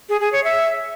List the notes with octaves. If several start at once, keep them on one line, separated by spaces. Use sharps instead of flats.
G#4
G#4
C#5
E5